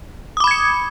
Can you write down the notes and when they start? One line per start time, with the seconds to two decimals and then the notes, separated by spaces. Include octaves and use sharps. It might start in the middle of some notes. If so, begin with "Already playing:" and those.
0.37 D#6
0.40 D6
0.44 B5
0.47 G#6
0.51 C#7